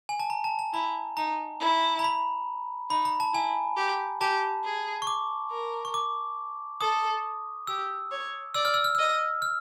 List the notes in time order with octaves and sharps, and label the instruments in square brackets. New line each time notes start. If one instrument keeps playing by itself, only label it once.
[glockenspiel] G#5
A5
A#5
A5
A5
[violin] E4 [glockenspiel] A#5
[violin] D#4 [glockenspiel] A#5
[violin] E4
[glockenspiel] A#5
B5
[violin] D#4 [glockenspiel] B5
[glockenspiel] A#5
A5
[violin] E4 [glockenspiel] G#5
[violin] G4
[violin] G4 [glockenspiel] A5
[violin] G#4
[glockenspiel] C#6
D6
[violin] A#4
[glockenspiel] C#6
D6
[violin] A4 [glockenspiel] D#6
[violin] G4 [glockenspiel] E6
[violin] C#5
[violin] D5 [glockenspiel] E6
[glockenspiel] F6
E6
F6
[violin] D#5 [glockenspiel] E6
[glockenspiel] F6